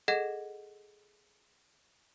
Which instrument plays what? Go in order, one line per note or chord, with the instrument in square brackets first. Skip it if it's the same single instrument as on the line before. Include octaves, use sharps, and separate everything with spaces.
[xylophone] G#4 A4 D#5 F#5 G#6 A#6